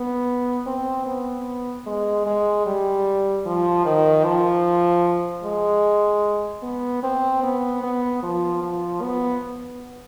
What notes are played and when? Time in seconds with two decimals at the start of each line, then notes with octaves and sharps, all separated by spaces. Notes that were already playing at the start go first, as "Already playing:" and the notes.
Already playing: B3
0.67 C4
1.06 B3
1.86 G#3
2.26 G#3
2.66 G3
3.46 F3
3.85 D#3
4.24 F3
5.44 G#3
6.63 B3
7.03 C4
7.43 B3
7.83 B3
8.23 F3
8.62 F3
9.01 B3